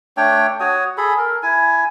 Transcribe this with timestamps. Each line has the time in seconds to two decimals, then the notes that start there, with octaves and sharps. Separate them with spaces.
0.17 A3 D4 C#5 G5
0.60 F#4 C#5 D#6
0.97 G#4 A4 B5
1.17 A#4
1.43 E4 G#5